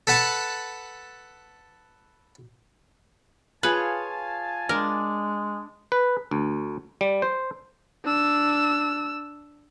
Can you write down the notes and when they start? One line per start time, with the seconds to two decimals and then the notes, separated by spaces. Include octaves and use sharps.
0.07 A4 B4 F#5 A5
3.63 F4 G#4 B4 C#5 F5 G#5 A5
4.69 G#3 D4 A#4
5.92 B4
6.31 D2
7.01 G3
7.22 C5
8.05 D4 E6